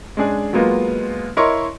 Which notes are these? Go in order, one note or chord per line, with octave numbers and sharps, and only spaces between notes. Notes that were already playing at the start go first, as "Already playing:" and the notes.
G#3 C#4 D4 G#4
F#3 G#3 A#3 B3 F4
E4 A#4 C#5 D#5 C6 C#6